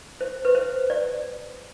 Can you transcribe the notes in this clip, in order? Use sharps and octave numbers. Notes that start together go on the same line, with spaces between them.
C5
B4
C5
D5